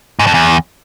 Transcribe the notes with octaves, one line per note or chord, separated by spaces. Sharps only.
G#2
F2
E2